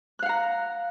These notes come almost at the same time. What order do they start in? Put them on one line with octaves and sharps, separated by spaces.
F#6 F5 F#5 A#5